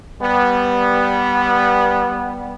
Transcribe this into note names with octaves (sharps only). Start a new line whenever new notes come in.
G3 B3